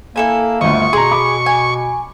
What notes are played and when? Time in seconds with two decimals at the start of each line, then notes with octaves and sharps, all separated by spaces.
0.16 A#3 E4 A4 G#5
0.61 G1 D2 D#5 C#6
0.93 B2 G#4 A#5 C6
1.11 B5 D6
1.46 G#5